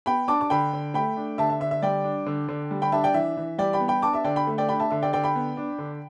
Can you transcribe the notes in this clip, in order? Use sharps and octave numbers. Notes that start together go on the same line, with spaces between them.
B3 G5 B5
D4 A5 D6
D6
D3 G5 B5
D3
A3 G5 B5
D4
D3 E5 A5
E5
D3 E5
E5
G3 D5 G5
D4
D3
D3
G3
G5 B5
D4 E5 A5
D5 G5
E3 E5
E3
G3 D5 G5
G5 B5
B3
G5 B5
D4 A5 D6
E5 A5
D3 D5 G5
G5 B5
A3
D5 G5
D4 G5 B5
E5 A5
D3 E5
D5 G5
D3 D5 G5
G5 B5
B3
D4
D3